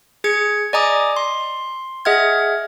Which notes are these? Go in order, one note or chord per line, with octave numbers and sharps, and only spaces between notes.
G#4 G#6 C#7
D5 D#5 G#5 A#5 D6 D#6
C6
G#4 D#5 E5 F#5 F6 G#6